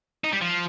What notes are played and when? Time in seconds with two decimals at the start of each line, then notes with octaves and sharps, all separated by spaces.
0.24 D#4
0.32 G3
0.41 F3